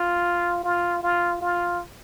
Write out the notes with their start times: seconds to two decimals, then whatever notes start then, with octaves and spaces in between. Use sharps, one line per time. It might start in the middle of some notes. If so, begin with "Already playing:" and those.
Already playing: F4
0.64 F4
1.03 F4
1.41 F4